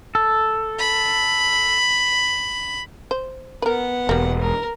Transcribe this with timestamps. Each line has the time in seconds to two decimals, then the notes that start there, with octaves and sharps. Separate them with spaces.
0.15 A4
0.79 B5
3.11 C5
3.62 B3 A#4 B4 F#5
4.09 E1 G3 A#3
4.41 A#4